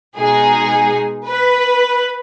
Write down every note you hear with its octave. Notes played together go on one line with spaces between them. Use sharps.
B2 G#3 D#4 G#4
B4